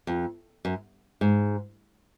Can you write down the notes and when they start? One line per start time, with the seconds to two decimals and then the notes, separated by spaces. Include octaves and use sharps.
0.07 F2
0.65 F#2
1.21 G#2